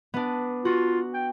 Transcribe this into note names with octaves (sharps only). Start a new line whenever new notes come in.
B3 D4
F4 F#4
G5